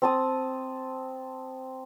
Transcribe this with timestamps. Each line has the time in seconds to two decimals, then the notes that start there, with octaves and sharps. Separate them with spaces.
0.02 C4 A5 D#6